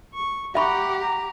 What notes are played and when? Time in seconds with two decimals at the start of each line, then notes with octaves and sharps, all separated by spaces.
0.14 C#6
0.55 G4 E5 F#5 A#5 B5 C#6
1.00 A#5